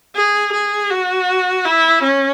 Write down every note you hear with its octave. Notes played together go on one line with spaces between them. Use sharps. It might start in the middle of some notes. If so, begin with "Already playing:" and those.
G#4
G#4
F#4
E4
C#4